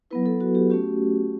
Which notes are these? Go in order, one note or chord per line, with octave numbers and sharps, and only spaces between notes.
F#3 B3 E4 B4
A4
F#4
G4
A3 C#4 F#4 G4